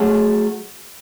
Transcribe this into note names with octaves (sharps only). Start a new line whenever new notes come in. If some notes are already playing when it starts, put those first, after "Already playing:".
Already playing: F#3 A3 C#4 G#4